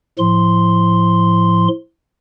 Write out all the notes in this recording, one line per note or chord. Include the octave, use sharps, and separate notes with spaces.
A2 F3 C6